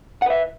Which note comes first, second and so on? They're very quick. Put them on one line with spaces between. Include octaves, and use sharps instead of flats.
F#5 B4 E5